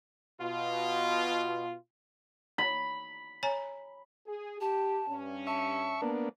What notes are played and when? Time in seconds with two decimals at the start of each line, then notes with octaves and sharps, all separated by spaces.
0.41 B2 F4
2.58 B5
3.43 C#5 G#5 A#5
4.27 G#4
4.61 G4 A5
5.08 G2 C#4
5.47 E5 A5 C#6
6.02 A#3 B3 D4